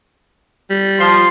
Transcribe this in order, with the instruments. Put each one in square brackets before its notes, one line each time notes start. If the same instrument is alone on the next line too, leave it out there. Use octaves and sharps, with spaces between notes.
[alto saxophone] G3
[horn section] F3 C6